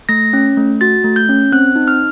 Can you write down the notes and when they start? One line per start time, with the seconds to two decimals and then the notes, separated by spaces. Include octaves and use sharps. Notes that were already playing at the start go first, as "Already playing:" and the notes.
0.09 A3 A#6
0.33 C#4
0.57 A3
0.81 F#4 A6
1.04 A3
1.16 G6
1.29 C#4
1.52 C4 F#6
1.76 D#4
1.88 F6